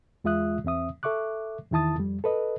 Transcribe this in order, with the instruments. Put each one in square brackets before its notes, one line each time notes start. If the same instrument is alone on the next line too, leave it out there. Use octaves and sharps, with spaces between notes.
[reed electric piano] E2 G#3 F4 E5 D#6 F#6
E2 C4 E5 D#6
A4 E5 C#6 D6 F#6
E2 D#3 E4 A5 D#6 A6
F2 G3
A4 B4 D#5